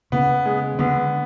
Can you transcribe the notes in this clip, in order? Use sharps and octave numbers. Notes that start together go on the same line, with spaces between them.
C#3 B3
G#3
D3 B3